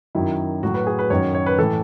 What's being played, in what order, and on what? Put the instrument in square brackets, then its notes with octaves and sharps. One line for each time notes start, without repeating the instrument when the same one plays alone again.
[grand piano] F#2 D#3 F#3 E4
A2 F#3 F#4
B4
G#4
B4
F#2 D#3 F#3 C#5
C#5
B4
A2 E3 A4